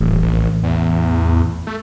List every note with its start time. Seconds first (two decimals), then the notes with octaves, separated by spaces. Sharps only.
0.01 D#1 A1
0.22 A#1
0.64 E2
1.67 A3